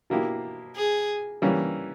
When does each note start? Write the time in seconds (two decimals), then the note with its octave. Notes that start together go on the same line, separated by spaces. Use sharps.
0.10 B2 A#3 E4 G4
0.76 G#4
1.42 E3 G3 A#3 C#4